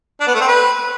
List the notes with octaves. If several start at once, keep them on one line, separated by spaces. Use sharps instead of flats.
D4
B3
A3
C4
B4